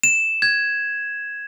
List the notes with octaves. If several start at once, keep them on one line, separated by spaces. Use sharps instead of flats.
E7
G#6